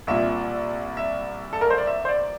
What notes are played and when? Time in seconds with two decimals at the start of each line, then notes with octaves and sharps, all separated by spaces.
0.07 C2 A#2 E5
0.97 E5
1.53 A4
1.61 A#4
1.70 C5
1.78 D5
1.87 E5
2.05 C5
2.08 D5